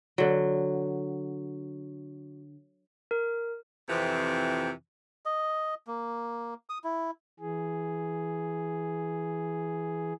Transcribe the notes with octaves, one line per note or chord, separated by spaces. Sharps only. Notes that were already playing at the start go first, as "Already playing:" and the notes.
D3 F#3
A#4
F2 C3 E3 F3
D#5
A#3
D#6
E4
E3 G#4